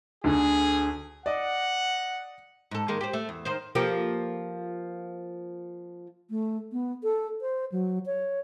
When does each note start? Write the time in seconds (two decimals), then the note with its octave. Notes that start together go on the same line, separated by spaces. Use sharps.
0.24 D2 D3 G#4
1.26 D5 D#5 F#5
2.71 G#2 A4
2.88 D#3 G#3 A#3
3.01 G4 C5
3.13 A3
3.29 E2
3.45 D#3 C5
3.75 F3 A#3 G4
6.30 A3
6.72 B3
7.03 A4
7.41 C5
7.72 F#3
8.06 C#5